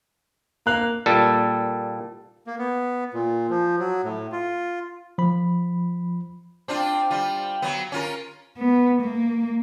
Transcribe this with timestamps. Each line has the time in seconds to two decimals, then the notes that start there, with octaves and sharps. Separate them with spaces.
0.67 A#3 F#6
1.06 A#2 G3 A4
2.47 A#3
2.58 B3
3.14 A#2
3.50 F3
3.79 F#3
4.04 A2
4.32 F4
5.18 F3 B5
6.68 C4 D4 F4
7.10 G3 F4
7.62 F#3 B3
7.92 C#4 F4 A#4
8.58 B3
9.01 A#3